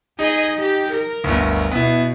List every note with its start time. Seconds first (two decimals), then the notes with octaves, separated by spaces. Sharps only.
0.19 D#4 G#4 D#5 G#5
0.57 G4
0.93 A#4
1.24 G1 D2
1.71 B2 B3 E4